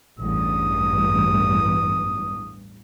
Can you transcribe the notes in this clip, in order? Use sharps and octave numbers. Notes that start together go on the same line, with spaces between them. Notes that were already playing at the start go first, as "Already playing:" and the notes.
A1 E2 G2 D#6